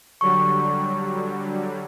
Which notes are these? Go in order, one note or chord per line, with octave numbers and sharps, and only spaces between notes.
D3 F#3 G3 C#6